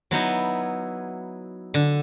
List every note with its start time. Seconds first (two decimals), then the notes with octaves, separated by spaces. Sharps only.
0.11 F#3 B3 D#4 E4
1.74 D3